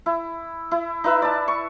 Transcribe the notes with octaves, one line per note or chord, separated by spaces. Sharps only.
E4
E4
D#4 E4 B4 E5
D5 A5
C#6